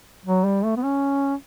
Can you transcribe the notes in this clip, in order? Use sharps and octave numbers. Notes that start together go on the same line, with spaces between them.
F#3
G3
A3
B3
C#4